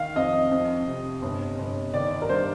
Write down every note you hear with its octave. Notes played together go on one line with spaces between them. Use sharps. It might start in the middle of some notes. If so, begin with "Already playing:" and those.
Already playing: D#3 F5
F2 D#5
F2
C3
G1
G1
D#3 D5
A#4
G2 C5